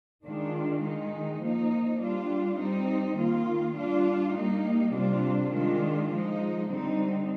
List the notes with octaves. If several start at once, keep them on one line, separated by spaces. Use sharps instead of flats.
D#3 G#3 D4 F4
D#3 G#3 D#4
F3 A#3 D#4
G3 D4 F4
G3 C4 D#4
D#3 A#3 F4
G3 D4 F4
G3 A#3 D#4
C3 G3 D4 F4
D#3 G#3 D4 F4
F3 G#3 D#4
D3 G3 C4 D#4